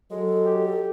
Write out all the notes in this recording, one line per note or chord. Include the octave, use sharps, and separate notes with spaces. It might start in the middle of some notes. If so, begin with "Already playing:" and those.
F#3 G#3 A4
G4